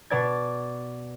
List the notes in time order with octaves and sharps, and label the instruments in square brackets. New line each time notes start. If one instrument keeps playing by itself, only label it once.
[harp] B2 D5 G#6